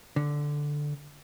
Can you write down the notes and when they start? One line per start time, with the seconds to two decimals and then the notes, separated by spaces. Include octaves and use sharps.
0.16 D3